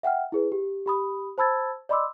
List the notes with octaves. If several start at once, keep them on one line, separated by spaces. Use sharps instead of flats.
E5 F#5 G5 F6
E4 G#4 B4
G4
G4 B5 D#6
C5 A5 B5 E6 G#6 A6
D5 D#5 B5 C6 D6 E6